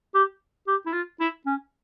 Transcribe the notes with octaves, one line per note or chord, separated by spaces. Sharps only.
G4
G4
E4
F4
E4
C#4